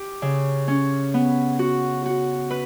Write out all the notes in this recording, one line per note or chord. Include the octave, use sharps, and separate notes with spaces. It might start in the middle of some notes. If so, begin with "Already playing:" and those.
Already playing: G4
C#3
C#4
B3
F#4
F#4
B4